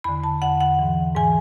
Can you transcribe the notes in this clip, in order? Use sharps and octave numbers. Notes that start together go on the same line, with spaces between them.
E2 D3 B5
A5
E2 D3 F#5
F#5
G#2 E3
G#2 E3 G#5